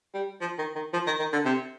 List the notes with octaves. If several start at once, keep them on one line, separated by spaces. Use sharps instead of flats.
G3
F3
D#3
D#3
F3
D#3
D#3
D3
C3